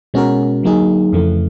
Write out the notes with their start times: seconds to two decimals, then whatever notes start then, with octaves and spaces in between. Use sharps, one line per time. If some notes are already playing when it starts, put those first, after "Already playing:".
0.14 B2 G#3 C#4 F#4 A#4
0.63 D3 F#3 A#3 D#4 G#4
1.13 F2 C#3 E3 A3